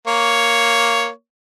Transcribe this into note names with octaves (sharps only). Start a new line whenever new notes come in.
A#3 C#5